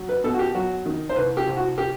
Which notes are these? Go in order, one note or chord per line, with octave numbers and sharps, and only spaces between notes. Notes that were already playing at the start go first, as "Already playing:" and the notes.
Already playing: F#3
B4
B2 A4
F#4
G4
F#3 F#4
D#3
C5
C2 B4
G4
C2
F#4
G4